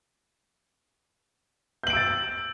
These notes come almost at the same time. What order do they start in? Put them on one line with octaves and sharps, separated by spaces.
G6 F#7 D7 E6 A6